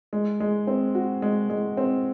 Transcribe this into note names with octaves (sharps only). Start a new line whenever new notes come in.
G#3
G#3
C4
F#4
G#3
G#3
C4